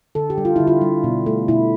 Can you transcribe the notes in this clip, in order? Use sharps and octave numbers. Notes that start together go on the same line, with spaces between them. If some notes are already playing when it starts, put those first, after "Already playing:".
D3 A4
G4
G3
F4
D3 E4
F4
G3
B2
A3
B2 E4